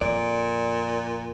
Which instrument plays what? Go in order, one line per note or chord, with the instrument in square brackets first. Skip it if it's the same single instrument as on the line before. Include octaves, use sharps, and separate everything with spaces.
[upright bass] F2 [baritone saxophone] A#2 [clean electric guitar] D5